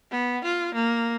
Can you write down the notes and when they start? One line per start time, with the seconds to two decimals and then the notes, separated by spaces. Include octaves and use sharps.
0.11 B3
0.44 F4
0.74 A#3